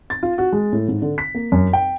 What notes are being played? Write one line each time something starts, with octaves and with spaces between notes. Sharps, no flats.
A6
F4
F#4
G#3
A2
G#2
D3
B6
A#3
F#2
G5